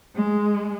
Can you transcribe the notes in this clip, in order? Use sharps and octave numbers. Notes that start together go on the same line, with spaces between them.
G#3